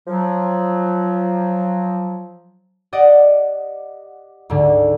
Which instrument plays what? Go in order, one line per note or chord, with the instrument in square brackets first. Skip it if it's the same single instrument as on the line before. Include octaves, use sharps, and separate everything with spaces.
[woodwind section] F3 F#3
[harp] G4 D5 D#5 F#5
D2 G#2 D3